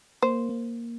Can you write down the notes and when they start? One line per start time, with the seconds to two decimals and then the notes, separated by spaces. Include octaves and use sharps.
0.22 A#3 C5
0.49 A#3